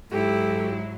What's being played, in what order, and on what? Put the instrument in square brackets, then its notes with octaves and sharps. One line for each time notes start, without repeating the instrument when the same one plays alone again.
[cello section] G#2 F#3 [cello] G#3 E4 [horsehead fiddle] G4 [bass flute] A4